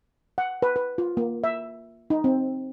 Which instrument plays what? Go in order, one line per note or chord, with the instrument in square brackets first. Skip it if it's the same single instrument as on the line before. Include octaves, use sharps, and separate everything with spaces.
[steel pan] F#5
B4
B4
F4
A#3
E5
D#4
C4